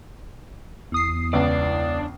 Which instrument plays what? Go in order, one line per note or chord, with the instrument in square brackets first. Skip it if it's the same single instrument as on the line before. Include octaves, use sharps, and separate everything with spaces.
[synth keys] E2 D#6 C7
[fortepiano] C#2 B3 [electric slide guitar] D4 D5